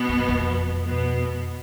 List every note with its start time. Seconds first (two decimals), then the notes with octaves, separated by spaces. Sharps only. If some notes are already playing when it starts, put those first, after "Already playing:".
Already playing: B2 B3
0.09 F#2
0.28 F2
0.86 B2 B3